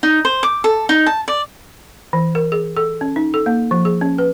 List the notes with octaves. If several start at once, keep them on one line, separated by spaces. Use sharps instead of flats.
D#4
C5
D6
A4
D#4
A5
D5
E3
A#4
G#4
A4
C#4
D#4
A4
A#3
F3
G#4
C#4
B4